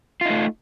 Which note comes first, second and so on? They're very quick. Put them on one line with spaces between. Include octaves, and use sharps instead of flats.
F4 D#4 A3